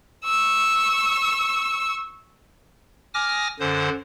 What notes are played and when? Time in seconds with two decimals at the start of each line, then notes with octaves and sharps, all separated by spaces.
0.24 C#6 E6
3.14 G#5 D6 D#6 F6 A#6
3.60 F#2 D3 C5